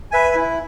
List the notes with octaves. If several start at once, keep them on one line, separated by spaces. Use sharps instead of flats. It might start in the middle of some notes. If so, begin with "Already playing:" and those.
B4 E5 G#5
E4